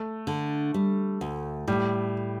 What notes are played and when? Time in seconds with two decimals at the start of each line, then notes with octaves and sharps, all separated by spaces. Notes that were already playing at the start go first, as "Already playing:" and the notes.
Already playing: A3
0.27 D3
0.74 G3
1.21 D2
1.68 A2 G3